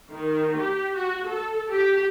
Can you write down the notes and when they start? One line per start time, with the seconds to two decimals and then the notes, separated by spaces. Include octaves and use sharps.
0.11 D#3
0.56 G4
0.95 F#4
1.26 A4
1.69 G4